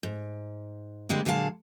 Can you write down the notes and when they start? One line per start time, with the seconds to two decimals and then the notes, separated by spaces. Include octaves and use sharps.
0.03 G#2
1.09 D3 G3 G#3 A#3 C4
1.25 A#2 D3 F#3 G#3 F5 A5